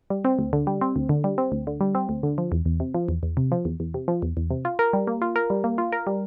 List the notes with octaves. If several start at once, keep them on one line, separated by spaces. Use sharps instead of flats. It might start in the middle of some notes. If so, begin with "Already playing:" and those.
G3
C4
D2
D3
G3
C4
D2
D3
G3
C4
D2
D3
G3
C4
D2
D3
F3
E2
E2
C3
F3
E2
E2
C3
F3
E2
E2
C3
F3
E2
E2
C3
F4
A#4
G3
A#3
F4
A#4
G3
A#3
F4
A#4
G3